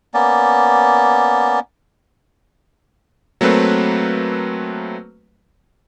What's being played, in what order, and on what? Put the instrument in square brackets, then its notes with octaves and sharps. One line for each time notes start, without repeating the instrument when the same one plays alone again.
[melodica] A#3 B3 C#4 D5
[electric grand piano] F#3 A3 A#3 C4 B4